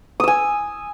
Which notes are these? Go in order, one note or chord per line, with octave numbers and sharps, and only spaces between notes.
G#5 D#6 E6